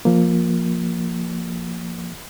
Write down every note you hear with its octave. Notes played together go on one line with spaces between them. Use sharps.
F3 A#3